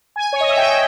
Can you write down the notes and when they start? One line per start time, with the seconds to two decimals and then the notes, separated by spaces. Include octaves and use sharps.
0.16 G#5
0.33 C#5
0.40 D#5
0.49 E5
0.58 G5